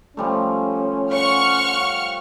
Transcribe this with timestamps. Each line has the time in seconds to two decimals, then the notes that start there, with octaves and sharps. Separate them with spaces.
0.17 F3 G3 A3 C#4
1.12 C#5 F#5 C#6 F6